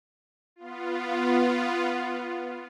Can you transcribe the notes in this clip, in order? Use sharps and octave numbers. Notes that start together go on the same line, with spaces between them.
B3 F4